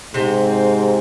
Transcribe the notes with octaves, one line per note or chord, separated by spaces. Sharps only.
G#2 C3 C4